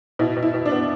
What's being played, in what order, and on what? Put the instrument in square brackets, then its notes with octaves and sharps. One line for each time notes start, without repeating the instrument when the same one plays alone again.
[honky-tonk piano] B2 E4
B2
E4
B2
D4
B3